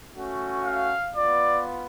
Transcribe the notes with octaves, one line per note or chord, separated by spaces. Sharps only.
A3 C#4 F#4
F5
B3 F4 D5